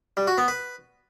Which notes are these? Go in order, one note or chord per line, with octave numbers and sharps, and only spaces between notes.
G3
F#4
B3
B4